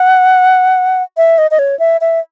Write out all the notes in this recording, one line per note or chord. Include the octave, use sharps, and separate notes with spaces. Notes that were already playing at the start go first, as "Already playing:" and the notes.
Already playing: F#5
E5
D#5
D#5
C#5
E5
E5